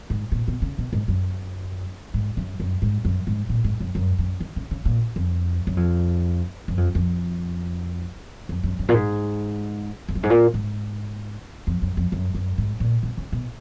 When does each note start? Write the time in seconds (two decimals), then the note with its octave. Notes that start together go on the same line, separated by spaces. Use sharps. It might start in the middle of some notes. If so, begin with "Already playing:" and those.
0.10 G#2
0.32 A#2
0.48 B2
0.62 C#3
0.78 B2
0.93 G#2
1.08 F#2
2.14 G#2
2.37 F#2
2.60 F#2
2.82 G#2
3.05 F#2
3.27 G#2
3.49 A#2
3.64 G#2
3.80 F#2
3.95 F#2
4.19 F#2
4.40 D#3
4.56 C#3
4.71 C#3
4.85 A#2
5.16 F2
5.67 F#2
5.77 F2
6.68 F#2
6.77 F2
6.95 F2
8.49 F2
8.64 F#2
8.79 F#2
8.89 A#2
8.94 G#2
10.09 F2
10.15 F#2
10.23 G#2
10.30 A#2
10.54 G#2
11.67 F2
11.82 F#2
11.97 F2
12.12 F#2
12.35 F#2
12.58 G#2
12.80 A#2
13.03 B2
13.17 C#3
13.32 B2